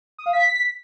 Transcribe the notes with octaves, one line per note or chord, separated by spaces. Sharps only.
D#6
F5
B6